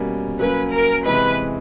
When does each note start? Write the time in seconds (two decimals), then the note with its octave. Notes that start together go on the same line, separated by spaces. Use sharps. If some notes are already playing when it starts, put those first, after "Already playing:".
Already playing: B2 G3 A#3 C#4
0.39 F#3 A#3 C#4 B4
0.73 A#4
1.05 C3 E3 G#3 B4